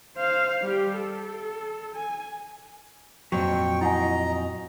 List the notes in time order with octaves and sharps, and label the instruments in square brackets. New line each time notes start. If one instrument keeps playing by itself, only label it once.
[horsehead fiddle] C5 F5
G3 G4
A4
G#5
[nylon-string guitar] F2 A#2 [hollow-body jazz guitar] F#3 [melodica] G5 C#6
[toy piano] E4 F#5 G#5 [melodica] D#5 A#5